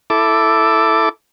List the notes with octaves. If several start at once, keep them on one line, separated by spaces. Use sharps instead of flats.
E4 A4 D6